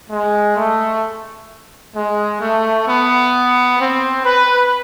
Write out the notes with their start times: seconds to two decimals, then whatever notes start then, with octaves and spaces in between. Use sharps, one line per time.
0.10 G#3
0.57 A3
1.95 G#3
2.41 A3
2.86 B3
3.79 C4
4.25 B4